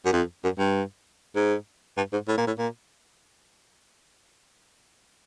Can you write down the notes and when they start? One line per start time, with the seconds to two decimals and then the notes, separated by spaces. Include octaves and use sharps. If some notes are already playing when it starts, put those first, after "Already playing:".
0.05 F#2
0.13 F2
0.44 F#2
0.59 G2
1.36 G#2
1.97 G2
2.13 G#2
2.28 A2
2.37 A#2
2.47 A2
2.58 A#2